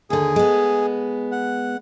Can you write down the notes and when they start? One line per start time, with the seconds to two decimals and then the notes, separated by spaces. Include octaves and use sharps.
0.10 D#2 D3 G#4
0.36 G#3 B3
1.32 F#5